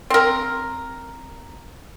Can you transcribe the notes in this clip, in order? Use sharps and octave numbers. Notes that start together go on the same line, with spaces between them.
C4 A#4